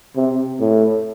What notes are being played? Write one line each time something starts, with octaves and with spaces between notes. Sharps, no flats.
C3
A2